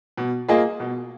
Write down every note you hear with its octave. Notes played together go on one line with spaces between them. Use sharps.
B2
A#3 F4 G#4 D#5
B2